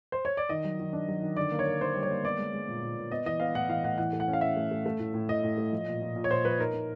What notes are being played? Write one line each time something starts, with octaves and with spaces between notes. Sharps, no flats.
C5
C#5
D5
D#3 D#5
F#3
D#3
D4
F#3
D#3
D3 D5
A#3
C#5
A#3
D#4 C5
G3
C#5
A#3
B3 D5
G#3
G#3
A#2
A#2
A#2
B3 D#5
E3 D#5
B3 F5
A2 F#5
E3 F5
A2 F#5
E3 F#5
A3
F#5
C#4
F5
C#4 E5
A3
A3
A3
A2
A2
A2 D#5
A2
A3
F3
A#2
A#2
A#2
C#5
A#2 C5
F3 B4
D#4 A#4
D#4